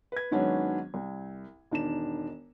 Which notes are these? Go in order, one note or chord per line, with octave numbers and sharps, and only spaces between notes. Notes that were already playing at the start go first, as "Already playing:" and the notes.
B4 G#6
G#2 D#3 F#3 B3 C#4 D4
C2
E1 D#3 D4 E7